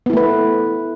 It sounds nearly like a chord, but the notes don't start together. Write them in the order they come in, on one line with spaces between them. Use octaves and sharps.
B3 E4 A3 B4